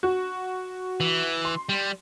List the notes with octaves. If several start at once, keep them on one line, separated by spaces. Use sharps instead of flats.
F#4
E3
C6
G3